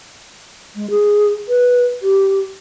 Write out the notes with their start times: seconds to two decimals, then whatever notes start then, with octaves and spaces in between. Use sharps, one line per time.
0.75 G#3
0.89 G#4
1.48 B4
2.02 G4